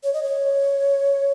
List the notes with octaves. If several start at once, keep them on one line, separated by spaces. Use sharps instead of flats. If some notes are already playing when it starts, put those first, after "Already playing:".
C#5
D#5
C#5